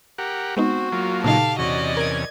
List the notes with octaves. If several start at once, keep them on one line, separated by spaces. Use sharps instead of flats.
G4 A#4 F#5
G#3 B3 C4 D#4 F#4
F#3 A#3 F4
A#2 C#3 D#4 G4 A4 F5
E2 C3 C#4 F#4 D5 D#5
A#4 G#6 D7